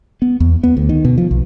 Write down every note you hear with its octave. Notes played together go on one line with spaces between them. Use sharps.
B3
E2
B3
D2
D#3
B2
F3
B1